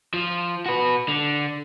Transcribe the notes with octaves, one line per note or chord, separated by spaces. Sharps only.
F3
F#4 B4
D3